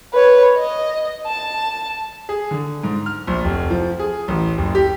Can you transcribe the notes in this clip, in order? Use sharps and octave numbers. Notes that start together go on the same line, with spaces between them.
B4 C#5
D#5
A5
G#4
D3
G#2
F6
A#1
F1
F3
G#4
A1
F#1
G4